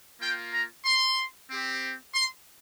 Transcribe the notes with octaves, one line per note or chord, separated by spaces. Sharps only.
A#3 F4 G5
A#5
C6
C4 G4
C6